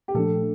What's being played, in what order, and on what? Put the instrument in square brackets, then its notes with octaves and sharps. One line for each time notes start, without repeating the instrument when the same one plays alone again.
[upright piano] G4
[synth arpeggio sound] A#2 F3 A3 D4 [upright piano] A4